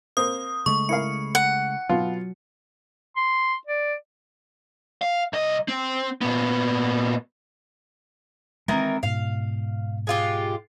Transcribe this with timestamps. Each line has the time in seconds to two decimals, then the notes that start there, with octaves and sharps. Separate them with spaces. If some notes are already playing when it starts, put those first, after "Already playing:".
0.17 A#3 C4 D#6
0.66 C#3 G#3 A3 C#6
0.89 E4 A#4 F5 C#7
1.35 F#5
1.89 B2 F#3 F4
3.16 C6
3.67 D5
5.02 F5
5.33 C2 D#5
5.68 C4
6.21 A#2 B3
8.68 D#3 E3 G#3 A3 C4 A#4
9.03 G#2 B2 F5
10.07 G#3 F4 G4